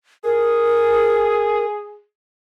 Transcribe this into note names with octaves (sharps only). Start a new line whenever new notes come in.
G#4 A#4